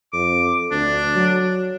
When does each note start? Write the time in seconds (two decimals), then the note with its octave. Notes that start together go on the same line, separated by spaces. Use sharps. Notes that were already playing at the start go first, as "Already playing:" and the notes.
0.13 F2 D6
0.72 D2 D4
1.15 F#3